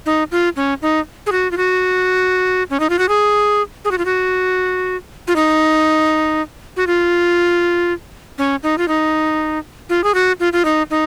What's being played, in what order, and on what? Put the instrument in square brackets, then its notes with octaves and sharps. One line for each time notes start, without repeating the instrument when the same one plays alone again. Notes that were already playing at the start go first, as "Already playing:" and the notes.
[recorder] D#4
F4
C#4
D#4
G#4
F#4
F4
F#4
C#4
D#4
F4
F#4
G#4
G#4
F#4
F4
F#4
F4
D#4
F#4
F4
C#4
D#4
F4
D#4
F4
G#4
F#4
F4
F4
D#4
D#4